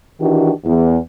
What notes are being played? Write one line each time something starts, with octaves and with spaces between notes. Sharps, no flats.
D#3 E3 D4 F#4 G4
E2